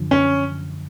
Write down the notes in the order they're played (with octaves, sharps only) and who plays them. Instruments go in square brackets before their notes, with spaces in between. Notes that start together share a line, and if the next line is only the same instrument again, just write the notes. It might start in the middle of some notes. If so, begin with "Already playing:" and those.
Already playing: [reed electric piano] F#2 D3 F3
[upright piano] C#4